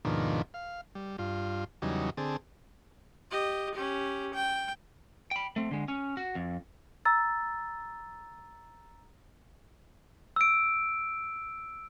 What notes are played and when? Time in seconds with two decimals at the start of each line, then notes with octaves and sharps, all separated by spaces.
0.05 D#2 G#2 B2 D#3 F3 D4
0.54 F5
0.95 G3
1.18 G2 F4
1.82 E2 C#3 F#3 G3 D#4
2.17 D3 C4 G#4 A5
3.31 G4 D#5
3.75 C#4 G4
4.34 G5
5.31 G5 B5
5.56 A3 C4
5.71 D3 G#3
5.88 C#4
6.17 F#4
6.35 F2
7.05 A#5 E6 A6
10.36 E6 D7